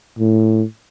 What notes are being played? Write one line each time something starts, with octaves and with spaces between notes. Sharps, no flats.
A2